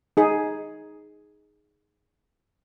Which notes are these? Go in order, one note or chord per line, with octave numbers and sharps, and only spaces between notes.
D#4 G#4